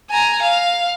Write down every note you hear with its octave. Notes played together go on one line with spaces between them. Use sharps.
G#5 A#5
F5